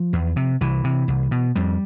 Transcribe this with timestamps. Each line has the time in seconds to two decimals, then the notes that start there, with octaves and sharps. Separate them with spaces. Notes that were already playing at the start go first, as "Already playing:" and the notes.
Already playing: F3
0.13 E2
0.36 C3
0.61 C2 E3
0.84 C3
1.08 C2
1.31 B2
1.56 F2 G3